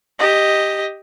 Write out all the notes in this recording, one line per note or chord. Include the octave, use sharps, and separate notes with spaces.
G4 D#5